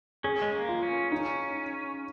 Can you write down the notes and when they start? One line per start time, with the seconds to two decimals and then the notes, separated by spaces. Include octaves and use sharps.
0.24 C#4 G#4
0.42 G#3
0.53 A#3
0.69 F4
0.83 C#4
1.12 C#4 D#4